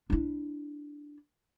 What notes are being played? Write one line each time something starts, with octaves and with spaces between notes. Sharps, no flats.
D4 E4